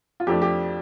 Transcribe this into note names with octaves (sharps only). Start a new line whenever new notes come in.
F4
F2 F3 A3 D4 G4
G4